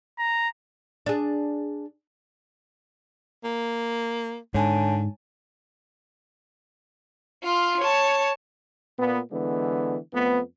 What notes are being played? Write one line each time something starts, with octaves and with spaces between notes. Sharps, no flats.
A#5
D4 G#4
A#3
G#2 D3 C#5 G#5 A5
F4 F5
C#5 A5
A#2 B3
D3 E3 G#3 B3
F2 A3 B3